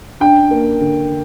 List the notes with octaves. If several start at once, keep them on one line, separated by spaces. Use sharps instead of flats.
D4 G5
A#3
D3